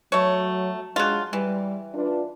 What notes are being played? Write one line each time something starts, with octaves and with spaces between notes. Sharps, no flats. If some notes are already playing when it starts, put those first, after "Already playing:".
F#3 A3 C#5
F#3 G#3 D4 F4 G#4
E3 G3
D4 F4 B4